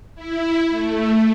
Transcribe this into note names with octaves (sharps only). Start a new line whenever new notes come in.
E4
A3